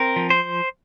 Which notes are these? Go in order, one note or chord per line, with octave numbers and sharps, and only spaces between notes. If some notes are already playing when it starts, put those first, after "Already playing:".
Already playing: C4 A#4
F3
C5